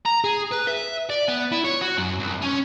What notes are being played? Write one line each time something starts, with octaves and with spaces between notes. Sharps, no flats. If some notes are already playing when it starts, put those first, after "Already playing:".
A#5
G#4
B4
E5
D5
B3
E4
C#5
F#4
F#2
C2
C#4